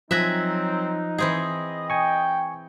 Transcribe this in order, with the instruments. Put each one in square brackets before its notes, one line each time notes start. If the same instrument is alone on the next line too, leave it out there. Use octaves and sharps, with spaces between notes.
[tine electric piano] F3 F#6 A#6 [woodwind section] F#3 C4 [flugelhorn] D#4 [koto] E5 G#5
[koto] E3 C4 G#4 [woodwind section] D#5
[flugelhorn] G5 [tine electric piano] G#5 C#6